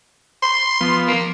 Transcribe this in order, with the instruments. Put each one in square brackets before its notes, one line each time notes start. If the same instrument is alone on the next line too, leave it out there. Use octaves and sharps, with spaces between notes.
[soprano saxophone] C6
[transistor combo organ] F3 B3
[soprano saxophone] A#3